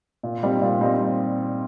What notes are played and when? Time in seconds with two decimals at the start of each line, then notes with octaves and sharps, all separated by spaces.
0.23 A#2
0.43 G3 C4 D#4
0.62 A#2
0.81 G3 C4 D#4